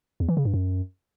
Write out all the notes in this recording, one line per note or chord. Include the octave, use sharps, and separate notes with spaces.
E2
E3
C#3
G2
F#2